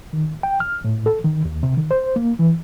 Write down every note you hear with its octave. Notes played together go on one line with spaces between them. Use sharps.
D#3
G5
F6
A2
A4
D#3
D#2
C3
D#3
C5
A#3
E3